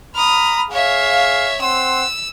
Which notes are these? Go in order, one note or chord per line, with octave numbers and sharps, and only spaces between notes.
A#5 B5 D#6 F6
G#4 C#5 E5 F5
C4 F#5 C6 E6